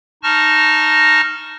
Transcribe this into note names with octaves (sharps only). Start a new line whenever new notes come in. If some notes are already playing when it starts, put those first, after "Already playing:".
D#4 A5 C#6 F6 A#6